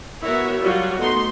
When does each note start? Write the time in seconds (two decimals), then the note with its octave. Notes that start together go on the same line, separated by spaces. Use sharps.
0.23 B3 E4 F#4 A#4 C#5 E5
0.61 F#3 G3 F4 F#4
1.00 A3 B3 D#4 C6